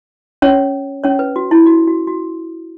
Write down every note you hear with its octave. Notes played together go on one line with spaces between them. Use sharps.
C#4 C#5
C#4 C#5
B4
F#4
E4
F#4
F#4
F#4